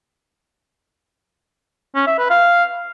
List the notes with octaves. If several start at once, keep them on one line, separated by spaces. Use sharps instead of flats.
C#4
E5
B4
F5